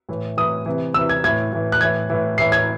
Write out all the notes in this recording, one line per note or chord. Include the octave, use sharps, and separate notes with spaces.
A2 E3
A2 E3 D#6
C3 E3
C3 E3 E6
G#6
A2 E3 G#6
A2 E3
F#6
A2 E3 G#6
A2 E3
A2 E3 C7
G#6